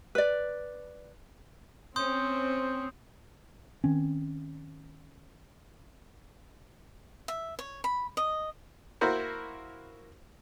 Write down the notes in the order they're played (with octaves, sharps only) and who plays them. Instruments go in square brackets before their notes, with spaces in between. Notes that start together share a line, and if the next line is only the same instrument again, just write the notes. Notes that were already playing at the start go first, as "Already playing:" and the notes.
[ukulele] B4 D5
[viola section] C4 [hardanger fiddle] C#4 [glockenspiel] C6 D#6 G6
[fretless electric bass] D#3 C4 C#4
[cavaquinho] E5
C#5
B5
D#5
[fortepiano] A#3 E4 F#4 A#4 C5